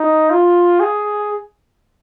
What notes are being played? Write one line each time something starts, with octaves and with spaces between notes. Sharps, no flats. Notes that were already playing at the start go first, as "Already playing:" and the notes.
Already playing: D#4
F4
G#4